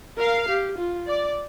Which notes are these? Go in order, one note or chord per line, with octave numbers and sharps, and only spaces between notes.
A#4 F5
G4
F4
D5